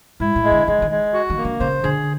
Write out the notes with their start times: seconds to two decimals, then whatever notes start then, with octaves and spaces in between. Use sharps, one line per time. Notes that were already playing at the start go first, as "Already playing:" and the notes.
0.20 G#2 E4
0.36 A2
0.44 G#3
0.52 D3
0.67 D#3 G#3
0.82 D#3
0.90 G#3
1.13 F#4
1.30 D#3
1.37 A#3
1.45 D3
1.60 C#3 C5
1.83 D3 G#4